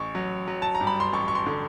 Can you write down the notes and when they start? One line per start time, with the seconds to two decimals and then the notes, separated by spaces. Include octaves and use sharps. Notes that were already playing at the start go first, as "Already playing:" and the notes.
Already playing: A1 C#6
0.15 F#3
0.48 F#3
0.62 A5
0.75 A#5
0.81 G2
0.87 B5
1.00 C6
1.13 A1 C#6
1.28 C#6
1.35 C6
1.46 D3